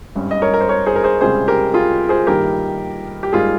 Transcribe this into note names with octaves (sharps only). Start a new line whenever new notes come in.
G#1 G2 G3 C#4
D#5
A#4 C#5
A#4
C5
A#4 C#5
G#4 C5
A#4
G#4 C5
C#2 C3 G3 C#4 G#4 C5
G4 A#4
F4 G#4
G#4 C5
G2 D#3 A#3 G4 A#4
G4
G#2 G3 A#3 F4 G#4